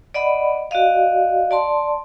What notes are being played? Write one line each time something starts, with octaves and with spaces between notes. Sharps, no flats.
D5 D#5 F#5 B5
F#4 D5 D#5 F5
D5 A5 C6